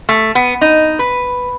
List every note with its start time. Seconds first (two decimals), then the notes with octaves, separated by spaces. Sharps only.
0.09 A3
0.35 B3
0.61 D#4
0.99 B4